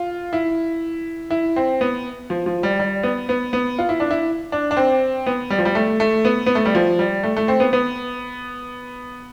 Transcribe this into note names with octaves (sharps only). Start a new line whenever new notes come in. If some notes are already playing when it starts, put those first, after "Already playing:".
Already playing: F4
E4
E4
C4
B3
F3
F3
G3
G3
B3
B3
B3
F4
E4
D4
E4
D4
D4
C4
B3
G3
F3
G3
A3
A3
B3
B3
A3
G3
F3
G3
A3
A3
C4
B3
B3